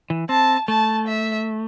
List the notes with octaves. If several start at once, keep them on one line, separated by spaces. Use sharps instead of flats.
E3
C4 A5
A3 A5
E5